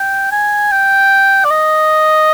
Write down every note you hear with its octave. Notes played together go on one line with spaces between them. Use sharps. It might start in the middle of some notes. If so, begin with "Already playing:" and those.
Already playing: G5
G#5
G5
D5
D#5